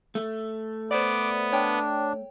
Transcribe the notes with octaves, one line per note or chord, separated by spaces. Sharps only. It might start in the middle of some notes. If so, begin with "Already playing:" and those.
A3
B3 C5 D5 D6
D4 C#5 G5